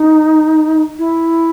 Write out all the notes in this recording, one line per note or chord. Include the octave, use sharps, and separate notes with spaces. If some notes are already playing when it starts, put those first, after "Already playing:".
Already playing: D#4
E4